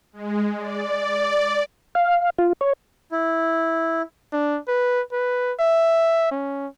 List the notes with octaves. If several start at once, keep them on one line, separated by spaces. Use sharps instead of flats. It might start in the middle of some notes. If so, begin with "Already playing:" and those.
G#3
D5
F5
F4
C#5
E4
D4
B4
B4
E5
C#4